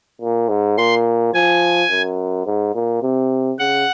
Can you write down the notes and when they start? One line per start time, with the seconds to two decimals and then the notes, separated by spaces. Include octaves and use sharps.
0.21 A#2
0.49 G#2
0.78 A#2 C6
1.34 F3 G#5
1.90 F#2
2.46 G#2
2.75 A#2
3.02 C3
3.59 C#3 F#5